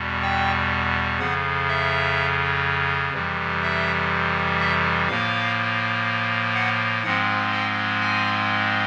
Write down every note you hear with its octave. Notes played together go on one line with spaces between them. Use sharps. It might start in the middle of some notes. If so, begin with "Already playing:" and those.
Already playing: E2 B2 G3
G5
F2 C#3 F3 F#5
E5
F2 C3 E3 G3
E5
E5
A2 F3 A#3 F5
F#5
G#2 F3 G#3 C4 F#5
G5
G#5